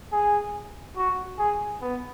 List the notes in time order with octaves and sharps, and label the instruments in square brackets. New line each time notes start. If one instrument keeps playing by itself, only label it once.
[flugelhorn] G#4
F#4
G#4
B3